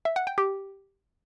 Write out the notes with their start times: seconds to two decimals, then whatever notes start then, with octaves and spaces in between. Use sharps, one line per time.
0.05 E5
0.16 F#5
0.27 G5
0.38 G4